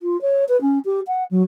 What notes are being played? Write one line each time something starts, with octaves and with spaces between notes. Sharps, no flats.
F4
C#5
B4
C#4
G4
F#5
F#3